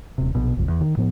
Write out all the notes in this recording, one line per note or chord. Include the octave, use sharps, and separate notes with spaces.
D#1 C3
A#1 B2
G#1 C#2 F#2
E2
D#3
A2 F3 B3